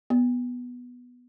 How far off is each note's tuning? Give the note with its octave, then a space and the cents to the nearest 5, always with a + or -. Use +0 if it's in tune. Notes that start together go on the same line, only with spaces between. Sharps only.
B3 -5